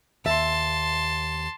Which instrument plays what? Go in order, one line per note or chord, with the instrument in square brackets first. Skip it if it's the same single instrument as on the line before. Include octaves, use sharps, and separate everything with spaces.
[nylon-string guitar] D#2 E5 [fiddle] A5 C6